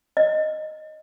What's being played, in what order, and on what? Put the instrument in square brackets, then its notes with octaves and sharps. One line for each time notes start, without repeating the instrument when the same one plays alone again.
[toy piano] D#5